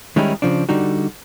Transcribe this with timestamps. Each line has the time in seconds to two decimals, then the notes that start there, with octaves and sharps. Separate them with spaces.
0.16 D#3 G3 G#3 C#4 D#4 E4
0.42 C#3 F3 D4
0.69 D3 G3 D#4 F#4